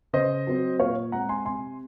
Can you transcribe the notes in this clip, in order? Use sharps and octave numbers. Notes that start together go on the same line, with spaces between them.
C#3 C5 D#5
F#3 C4
A#2 C#5 F5
G#3 C4 F#5 A#5
G#5 C6
C3 G#5 C6